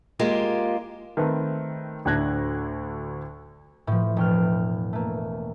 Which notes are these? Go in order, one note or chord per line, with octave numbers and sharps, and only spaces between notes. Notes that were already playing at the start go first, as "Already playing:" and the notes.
G#3 A#3 F4 G4
D#3 A3 C4 B4
D2 A2 D4 F#6 G#6 A#6
A2 F3
E1 G5 F6
A3 A#3